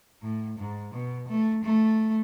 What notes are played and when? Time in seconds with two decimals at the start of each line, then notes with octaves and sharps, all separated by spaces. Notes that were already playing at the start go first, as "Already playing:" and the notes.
0.22 A2
0.58 G#2
0.93 B2
1.28 A3
1.63 A3